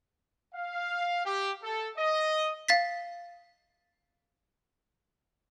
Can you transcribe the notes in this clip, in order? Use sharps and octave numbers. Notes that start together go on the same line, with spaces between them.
F5
G4
A4
D#5
F5 A6 B6